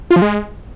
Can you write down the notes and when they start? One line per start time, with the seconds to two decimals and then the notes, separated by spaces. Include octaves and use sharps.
0.11 F4
0.16 F3
0.22 G#3